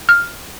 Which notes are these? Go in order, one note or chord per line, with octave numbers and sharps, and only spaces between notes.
F6